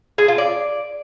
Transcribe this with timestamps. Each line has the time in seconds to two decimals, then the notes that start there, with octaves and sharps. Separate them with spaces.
0.18 G#4
0.28 F4
0.38 D5